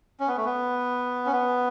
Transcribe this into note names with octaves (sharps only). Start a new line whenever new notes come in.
C#4
B3
A3
B3
C#4
B3